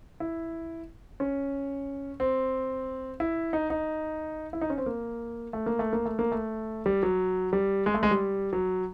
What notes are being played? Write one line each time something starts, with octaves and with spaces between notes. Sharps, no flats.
E4
C#4
C4
E4
D#4
D#4
E4
D#4
C#4
C4
A#3
A3
A#3
A3
A#3
A3
A#3
A3
G3
F#3
G3
G#3
A3
G#3
G3
F#3